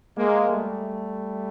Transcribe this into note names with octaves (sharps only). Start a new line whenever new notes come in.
G#3 A#3
G3 A3